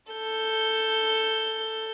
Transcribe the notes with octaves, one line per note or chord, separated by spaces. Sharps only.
A4 G6